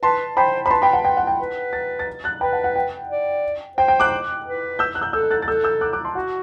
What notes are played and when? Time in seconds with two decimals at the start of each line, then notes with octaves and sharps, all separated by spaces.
0.03 B4 A5 C6
0.37 C5 G5 B5
0.66 C5 B5
0.70 B4 A5 C6
0.82 G5 B5
0.93 F#5 A5
1.05 G5
1.17 F#5
1.27 G5
1.40 B4
1.73 A6
1.99 A6
2.24 F#6 A6
2.41 B4 G5 B5
2.52 F#5 A5
2.64 F#5
2.76 G5
3.09 D5
3.77 C5 G5
3.88 G5
4.00 D6 F#6
4.46 B4
4.79 E6 G6
4.95 F#6
5.01 E6 G6
5.13 A4 E6 G6
5.30 F#6 A6
5.42 A6
5.47 A4 E6 G6
5.64 E6 G6
5.81 D6 F#6
5.93 D6 F#6
6.05 A5 C6
6.15 F#4 F#5